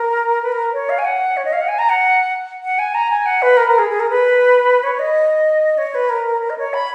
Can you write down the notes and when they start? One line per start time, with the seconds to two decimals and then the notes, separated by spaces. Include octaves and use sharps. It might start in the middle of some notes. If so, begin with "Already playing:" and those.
Already playing: A#4
0.42 B4
0.52 A#4
0.74 C#5
0.89 F5
0.99 G#5
1.05 F#5
1.37 C#5
1.45 D#5
1.53 F5
1.61 F#5
1.68 G#5
1.79 A#5
1.89 F#5
2.63 F#5
2.79 G#5
2.95 A#5
3.10 G#5
3.26 F#5
3.42 B4
3.57 A#4
3.68 A#4
3.78 G#4
3.90 G#4
4.00 A#4
4.10 B4
4.83 C#5
4.99 D#5
5.78 C#5
5.95 B4
6.10 A#4
6.26 A#4
6.42 A#4
6.50 D#5
6.58 C#5
6.74 B5